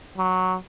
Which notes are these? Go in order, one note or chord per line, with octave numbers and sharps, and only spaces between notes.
F#3